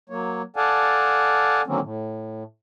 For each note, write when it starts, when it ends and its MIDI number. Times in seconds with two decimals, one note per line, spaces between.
0.10 0.42 54
0.10 0.42 58
0.10 0.42 73
0.56 1.62 69
0.56 1.62 74
0.56 1.62 77
0.56 1.62 78
0.56 1.62 80
0.56 1.62 81
1.67 1.80 50
1.67 1.80 51
1.67 1.80 54
1.67 1.80 58
1.67 1.80 60
1.67 1.80 61
1.82 2.43 45